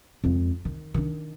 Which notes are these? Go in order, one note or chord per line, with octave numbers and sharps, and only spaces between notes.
F2 G#3
D#3
D#3 D4